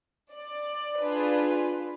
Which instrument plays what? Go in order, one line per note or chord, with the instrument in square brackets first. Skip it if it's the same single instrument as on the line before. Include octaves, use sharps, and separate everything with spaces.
[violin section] D5
D4 F4 G#4 B4